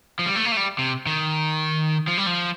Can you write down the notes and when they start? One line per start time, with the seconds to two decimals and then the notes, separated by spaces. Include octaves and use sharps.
0.19 F3
0.26 G3
0.36 A3
0.45 A#3
0.52 A3
0.57 G3
0.79 C3
1.07 D#3
2.08 F3
2.17 G3
2.27 F3